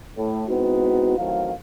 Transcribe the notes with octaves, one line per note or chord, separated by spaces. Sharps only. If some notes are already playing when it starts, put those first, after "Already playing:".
A2
G#3 B3 C4 D#4 E4 F#4
A1 A2 D#3 F#3 C4 F5